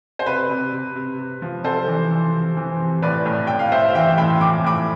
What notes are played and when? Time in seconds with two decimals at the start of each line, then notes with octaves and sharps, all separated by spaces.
0.19 C5
0.26 C3 B4
0.49 C3
0.72 C3
0.95 C3
1.18 C3
1.42 F3
1.64 C3 A4 C5
1.87 E3
2.11 E3
2.33 C3
2.57 E3
2.79 C3
3.02 A2 B4 D5
3.26 A2
3.47 A2 G5
3.59 F5
3.72 A2 C5 E5
3.88 F5
3.95 E3 E5 G5
4.18 A2 G5 B5
4.41 F3 D6
4.64 A2 B5 D6